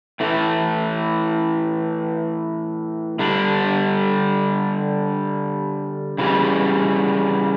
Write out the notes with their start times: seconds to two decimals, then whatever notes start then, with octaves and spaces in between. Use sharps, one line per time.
0.20 A2 E3 A3
3.19 D3 G3 D4
6.18 C#3 E3 G3